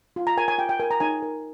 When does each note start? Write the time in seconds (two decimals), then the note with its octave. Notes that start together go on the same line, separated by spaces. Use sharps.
0.16 F4
0.27 A#5
0.37 A#4 G#5
0.48 G#5
0.58 F4 G5
0.69 G5
0.80 A#4 G#5
0.91 A#5
1.00 D#4 G#5
1.22 A#4